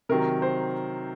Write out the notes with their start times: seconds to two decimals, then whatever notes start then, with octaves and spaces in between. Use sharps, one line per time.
0.09 C3 D#3 F#3 A#4
0.42 C5